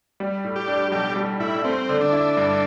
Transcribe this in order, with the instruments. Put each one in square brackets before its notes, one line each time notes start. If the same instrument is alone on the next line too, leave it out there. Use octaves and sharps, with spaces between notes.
[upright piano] G3
A2
[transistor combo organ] G4
[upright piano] D4
[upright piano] B1 [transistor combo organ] G4
[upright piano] G3
[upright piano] A2 [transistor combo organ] E4
[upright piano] A3 [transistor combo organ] C4
[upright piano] D3
[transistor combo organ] D4
[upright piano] E4
G2